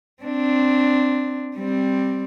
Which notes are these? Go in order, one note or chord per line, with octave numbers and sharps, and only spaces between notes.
C4 D4
G3 C4